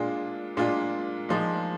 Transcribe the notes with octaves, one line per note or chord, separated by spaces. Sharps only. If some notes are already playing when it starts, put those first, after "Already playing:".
Already playing: A#2 G#3 D4 F4
A#2 G#3 D4 F4
A#2 F3 G#3 D#4